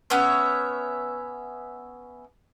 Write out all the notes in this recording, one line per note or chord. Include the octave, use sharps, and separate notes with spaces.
B3 C#4 C#5 E5